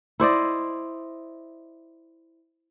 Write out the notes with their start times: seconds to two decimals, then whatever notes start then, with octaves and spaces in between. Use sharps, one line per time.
0.20 E4 C5 D5 D#5